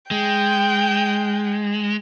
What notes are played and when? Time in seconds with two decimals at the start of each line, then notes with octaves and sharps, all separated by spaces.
0.11 G#3 G5